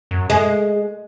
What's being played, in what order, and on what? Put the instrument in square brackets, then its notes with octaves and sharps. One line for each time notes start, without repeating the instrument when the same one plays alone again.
[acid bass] F#2
[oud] G#3 [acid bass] G#4